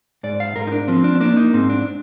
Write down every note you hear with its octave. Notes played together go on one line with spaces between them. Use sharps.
G#2 D5
F5
G#2 A#4
D#4
D4
F3 C4
D4
C4
A#3 D4
D#4
G#2 C4
D4